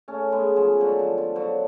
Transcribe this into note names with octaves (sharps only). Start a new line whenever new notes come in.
A3 C#4
G#3 B3
F3 G#3
D3 F#3
F3
F3
D3 F#3